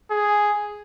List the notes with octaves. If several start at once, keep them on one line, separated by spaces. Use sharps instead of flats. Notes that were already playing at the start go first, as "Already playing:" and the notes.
G#4